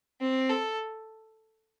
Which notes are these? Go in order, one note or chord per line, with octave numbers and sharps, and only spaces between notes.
C4
A4